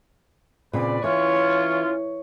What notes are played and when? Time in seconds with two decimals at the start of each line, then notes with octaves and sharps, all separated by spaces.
0.73 A#2 C#3 C4 B4 D5
1.04 E3 C#4 F4 C#5